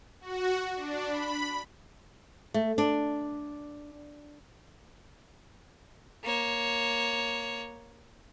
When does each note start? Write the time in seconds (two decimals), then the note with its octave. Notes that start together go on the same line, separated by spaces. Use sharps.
0.21 F#4
0.76 D4
1.06 B5
2.54 A3
2.78 D4
6.24 A#3 C#5